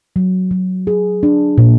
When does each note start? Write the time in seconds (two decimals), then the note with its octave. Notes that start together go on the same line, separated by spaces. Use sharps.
0.16 F#3
0.51 F#3
0.87 G#4
1.23 D4
1.58 A#2